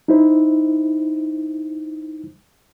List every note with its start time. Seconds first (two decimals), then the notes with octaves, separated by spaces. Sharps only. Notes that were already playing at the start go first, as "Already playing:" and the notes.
0.08 D#4 E4 C5